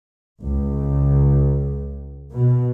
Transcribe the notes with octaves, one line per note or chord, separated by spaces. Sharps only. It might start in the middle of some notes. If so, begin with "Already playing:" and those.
C#2
B2